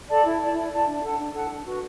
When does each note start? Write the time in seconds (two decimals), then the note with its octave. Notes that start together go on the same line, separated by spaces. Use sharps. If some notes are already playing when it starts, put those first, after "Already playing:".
0.09 A4 D5 A5
0.24 E4
0.39 D5 A5
0.55 E4
0.72 D5 A5
0.87 D4
1.03 A4 F#5 A5
1.18 D4
1.34 A4 F#5 A5
1.49 D4
1.65 F#4 B4